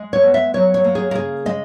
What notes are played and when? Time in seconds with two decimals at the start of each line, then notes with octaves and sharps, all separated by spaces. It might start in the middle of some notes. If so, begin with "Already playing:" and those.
Already playing: G#3
0.13 C#5
0.23 B3
0.34 E5
0.54 F#3 C#5
0.74 C#5
0.84 A#3
0.95 G#4
1.11 A#4
1.15 C#3 G#4
1.46 G#3 D#5